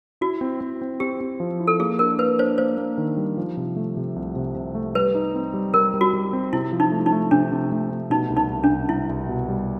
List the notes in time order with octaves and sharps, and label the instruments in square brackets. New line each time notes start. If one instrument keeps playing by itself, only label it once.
[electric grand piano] E4 [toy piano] F#4
[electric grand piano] C4
C4
C4
[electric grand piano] C4 [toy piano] G4
[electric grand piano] C4
F3
E4
[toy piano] A4
[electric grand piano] A#3 [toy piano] G#4
[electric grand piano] D4 [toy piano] A#4
[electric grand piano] A#3 [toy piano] B4
[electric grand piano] D4 [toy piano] C5
[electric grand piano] A#3 [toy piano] C5
[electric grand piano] A#3
D#3
G3
F3
C3
A3
C3
C2
C3
C3
A3
[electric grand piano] G3 [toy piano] B4
[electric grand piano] D#4
C4
G3
[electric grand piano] G3 [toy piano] A#4
[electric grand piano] G3
[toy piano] F#4
[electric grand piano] G3
C4
[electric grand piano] C3 [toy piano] E4
[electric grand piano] F3
[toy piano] D#4
[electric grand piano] A3
[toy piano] D#4
[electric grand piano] A3
[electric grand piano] C3 [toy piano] D4
[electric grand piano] C3
A3
A3
[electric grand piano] B2 [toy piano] D#4
[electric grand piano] C2
[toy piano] D#4
[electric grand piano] C2
[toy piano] D4
[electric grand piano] C2
[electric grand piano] C2 [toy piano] E4
[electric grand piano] C2
B2
G3